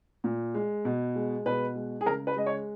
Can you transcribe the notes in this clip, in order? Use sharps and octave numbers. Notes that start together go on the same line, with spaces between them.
A#2
G#3
B2
G#3
B2 B4
G#3
G#4
C#3 A#4
B4
G#3 D#5
C#5